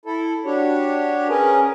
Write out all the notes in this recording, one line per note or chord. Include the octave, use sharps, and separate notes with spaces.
E4 A4
D4 F#4 G4 C#5
C#4 G#4 A#4 B4